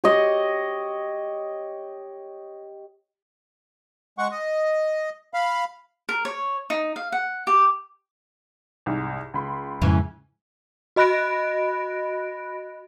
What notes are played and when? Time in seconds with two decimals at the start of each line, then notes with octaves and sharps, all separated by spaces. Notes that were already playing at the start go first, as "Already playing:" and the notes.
0.04 G4 C#5 D#5
4.18 G#3 F#5 C#6
4.31 D#5
5.34 F5 B5
6.09 A#4
6.25 C#5
6.70 D#4
6.96 F5
7.12 F#5
7.47 G4
8.86 C2 G#2
9.34 C#2 B5 C6
9.82 F2 G#2 C#3 E3 C#4
10.96 F#4 D#5 B5 F#6 A#6 D7